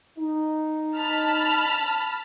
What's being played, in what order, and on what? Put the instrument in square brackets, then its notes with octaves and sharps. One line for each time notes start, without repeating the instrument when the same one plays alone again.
[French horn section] D#4
[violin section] A5 B5 F6